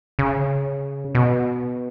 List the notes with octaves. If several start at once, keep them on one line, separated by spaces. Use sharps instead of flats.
C#3
B2